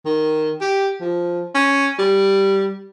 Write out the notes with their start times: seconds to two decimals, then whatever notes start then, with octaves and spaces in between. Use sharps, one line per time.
0.06 D#3
0.61 G4
1.01 F3
1.55 C#4
1.99 G3